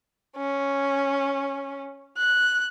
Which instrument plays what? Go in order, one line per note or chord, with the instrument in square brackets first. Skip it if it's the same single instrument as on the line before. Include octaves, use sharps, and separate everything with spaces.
[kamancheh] C#4
F#6